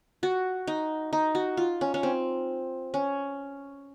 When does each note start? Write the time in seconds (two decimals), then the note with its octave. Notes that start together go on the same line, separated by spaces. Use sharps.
0.23 F#4
0.67 D#4
1.13 D#4
1.35 F#4
1.57 F4
1.81 C#4
1.94 C#4
2.03 C4
2.94 C#4